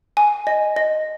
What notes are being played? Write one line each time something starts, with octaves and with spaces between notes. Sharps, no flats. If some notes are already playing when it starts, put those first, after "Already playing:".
G#5
D#5
D#5